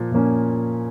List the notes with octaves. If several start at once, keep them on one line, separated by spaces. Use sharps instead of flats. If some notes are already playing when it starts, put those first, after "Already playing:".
Already playing: A#2 F3 A#3
A#2 F3 A#3 C#4